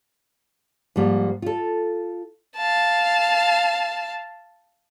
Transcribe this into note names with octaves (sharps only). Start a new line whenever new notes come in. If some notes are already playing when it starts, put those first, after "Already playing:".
G#2 F3 G3 A#3
F4 A4
F5 A5